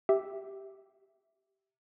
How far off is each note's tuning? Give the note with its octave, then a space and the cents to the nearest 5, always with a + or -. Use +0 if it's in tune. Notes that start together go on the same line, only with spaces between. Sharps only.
G4 +0 E5 +0